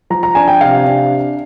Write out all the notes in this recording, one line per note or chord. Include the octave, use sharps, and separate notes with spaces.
F3 A#5
A#5
D4 G#5
G5
C3 F5
D4